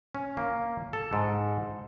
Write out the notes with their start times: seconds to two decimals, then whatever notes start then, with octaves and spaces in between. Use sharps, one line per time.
0.15 C#4
0.37 A#3
0.93 A4
1.13 G#2